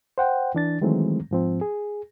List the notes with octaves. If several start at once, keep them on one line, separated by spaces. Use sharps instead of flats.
C5 F#5 G5
E3 D4 A6
D#3 E3 F#3 G#3 A3 C4
G#2 F3 C4
G#4